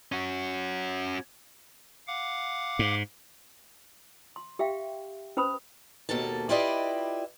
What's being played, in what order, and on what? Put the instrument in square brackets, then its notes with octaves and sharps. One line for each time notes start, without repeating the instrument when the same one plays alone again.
[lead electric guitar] C#4 F#4
[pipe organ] F5 F#5 D6
[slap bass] G#2
[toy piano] C6
G4 E5 F5 G5
C#4 B4 C5 B5 D#6
[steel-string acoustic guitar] D#2 B2 A#3 A4 A5
E4 F4 G4 B4 D5 D#5